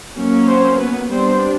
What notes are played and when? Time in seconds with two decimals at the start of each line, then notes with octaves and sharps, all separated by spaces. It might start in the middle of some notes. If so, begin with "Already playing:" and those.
0.16 F#3 A#3 C#4
0.47 C4 C5
0.78 B3 B4
1.10 G3 B3 C4 D4 C5